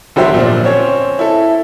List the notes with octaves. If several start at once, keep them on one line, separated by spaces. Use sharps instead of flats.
E1 D3 F#3 G4 C5 E5
A#2 F3 D4
C4 C#4 C#5
E4 A4